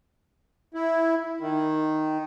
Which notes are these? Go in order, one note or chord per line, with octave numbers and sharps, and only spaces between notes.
E4
D#3